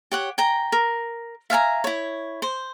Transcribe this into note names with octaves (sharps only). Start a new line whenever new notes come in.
G4 C#5 F#5
G5 G#5 A#5
A#4
E5 F5 G#5 A#5
E4 C#5
C5